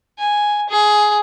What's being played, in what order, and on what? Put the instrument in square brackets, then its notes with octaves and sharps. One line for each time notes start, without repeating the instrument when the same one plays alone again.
[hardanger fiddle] G#5
G#4